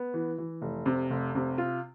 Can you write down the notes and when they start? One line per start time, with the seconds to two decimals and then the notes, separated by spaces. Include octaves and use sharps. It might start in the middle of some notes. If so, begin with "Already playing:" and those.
Already playing: B3
0.14 E3
0.38 E3
0.61 F1
0.86 C3
1.10 F1
1.35 C3
1.58 F4